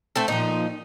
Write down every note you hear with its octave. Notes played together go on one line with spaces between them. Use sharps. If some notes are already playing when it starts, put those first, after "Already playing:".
A3 C4 A4
A#2 F3 D#4